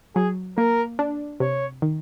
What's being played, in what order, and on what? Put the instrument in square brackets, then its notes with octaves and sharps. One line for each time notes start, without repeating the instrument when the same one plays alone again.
[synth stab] F#3 [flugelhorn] G#4
[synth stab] A#3 [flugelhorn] A#4
[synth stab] D4
[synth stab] C3 [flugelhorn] C#5
[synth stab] D#3